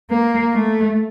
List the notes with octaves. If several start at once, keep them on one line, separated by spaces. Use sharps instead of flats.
A#3
A3